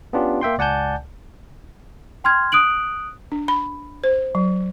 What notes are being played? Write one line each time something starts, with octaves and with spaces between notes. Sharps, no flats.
B3 C#4 D4 F4 G4
A#3 E5 G5 C6
C#2 D5 F#5 G#5 A5 G6
G5 C6 F6 G#6
D#6 F#6 D7 F#7
D4
B5
C5
F#3